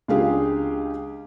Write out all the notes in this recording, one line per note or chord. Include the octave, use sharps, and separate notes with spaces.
C#2 D4 F4 G4 G#4 F5